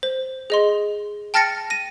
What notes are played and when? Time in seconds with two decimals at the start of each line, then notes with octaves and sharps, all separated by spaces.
0.03 C5
0.50 G#4 D#5 C6
1.34 G5 A5 F6 A6 A#6 C#7
1.70 A#6 D#7